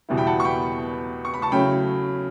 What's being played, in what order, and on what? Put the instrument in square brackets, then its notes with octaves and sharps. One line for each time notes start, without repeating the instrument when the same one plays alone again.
[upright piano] E2 B2 G3 B3 E4
G5 B5
F#5 A5
C#6
G5 B5
C#6
B5
A5 C#6
C#3 F#3 A3 C#4 E4 G5 B5